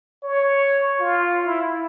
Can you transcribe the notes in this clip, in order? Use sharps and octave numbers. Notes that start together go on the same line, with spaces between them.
C#5
F4
E4